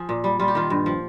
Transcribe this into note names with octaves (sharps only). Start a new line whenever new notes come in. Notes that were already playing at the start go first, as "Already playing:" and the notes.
Already playing: F3 G#4
A#2
G3
G3 F4
G4
D#3 F4
G2
F3